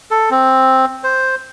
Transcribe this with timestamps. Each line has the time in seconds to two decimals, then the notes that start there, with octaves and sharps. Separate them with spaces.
0.11 A4
0.30 C4
1.04 C5